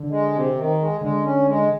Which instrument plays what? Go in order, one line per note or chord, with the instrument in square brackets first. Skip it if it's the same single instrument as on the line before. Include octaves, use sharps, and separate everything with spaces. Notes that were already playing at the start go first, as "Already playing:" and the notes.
Already playing: [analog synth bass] D3
[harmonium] G#3
C3
D#3
G#3
[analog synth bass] D3 [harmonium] G#3
[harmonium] C#4
G#3